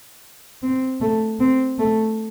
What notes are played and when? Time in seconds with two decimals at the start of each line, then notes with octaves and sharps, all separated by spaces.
0.63 C4
1.01 A3
1.40 C4
1.79 A3